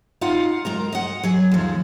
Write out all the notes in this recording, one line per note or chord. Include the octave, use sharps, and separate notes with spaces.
D#4 F4 F5 F#5
G#3 A#4 A#5
D#5 F#5
F#3 G#4
D#2 F3